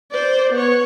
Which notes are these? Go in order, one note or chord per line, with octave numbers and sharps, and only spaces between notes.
C5 D5
B3 C#5